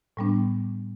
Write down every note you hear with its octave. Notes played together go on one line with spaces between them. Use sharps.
A2 G3 B3 D4